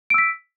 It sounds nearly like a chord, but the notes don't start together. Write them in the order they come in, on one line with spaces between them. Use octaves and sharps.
D7 E6 B6